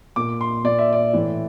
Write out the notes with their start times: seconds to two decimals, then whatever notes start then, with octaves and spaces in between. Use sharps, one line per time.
0.16 A#2 D6
0.41 C6
0.64 A#2 D5
0.79 E5
0.93 D5
1.13 A2 E3